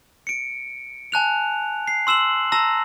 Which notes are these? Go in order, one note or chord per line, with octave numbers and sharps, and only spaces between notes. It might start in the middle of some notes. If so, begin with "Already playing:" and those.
C#7 D7
G#5 A5 F#6 F7
C7
C6 E6 E7 F#7
A5 A#5 E6 A#6